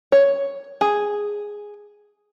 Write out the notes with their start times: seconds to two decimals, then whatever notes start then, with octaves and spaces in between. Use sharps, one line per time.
0.12 C#5
0.81 G#4